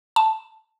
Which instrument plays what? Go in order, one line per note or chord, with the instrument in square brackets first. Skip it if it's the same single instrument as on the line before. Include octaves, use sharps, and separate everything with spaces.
[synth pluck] A5